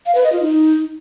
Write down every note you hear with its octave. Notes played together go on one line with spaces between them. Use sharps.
F5
B4
D#5
F4
D#4